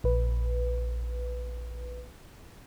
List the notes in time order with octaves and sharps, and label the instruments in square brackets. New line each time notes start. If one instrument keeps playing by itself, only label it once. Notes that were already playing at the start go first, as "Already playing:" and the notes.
[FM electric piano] A#1 B4